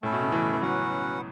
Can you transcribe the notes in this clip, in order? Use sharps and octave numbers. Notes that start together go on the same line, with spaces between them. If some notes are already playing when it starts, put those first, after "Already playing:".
A2 A3 C#4 E4 A4
B2
C#3
E3
E3
F#3 C#4 F#4 B4 F#5